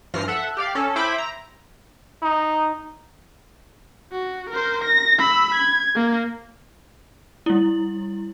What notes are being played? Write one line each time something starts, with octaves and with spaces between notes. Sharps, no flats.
G2 E3 F3 F6 A#6 C7
A4 E5 F#5
G4 D5 F5
C#4 A4
E4 C5 E5 G5 B5 D6
A#5
D#4
F#4
A#4 C5
A#6
B5 E6
G#6
A#3
G3 E4